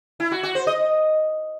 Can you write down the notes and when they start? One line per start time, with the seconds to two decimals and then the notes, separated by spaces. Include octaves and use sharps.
0.20 E4
0.32 F#4
0.43 F#4
0.55 C5
0.67 D#5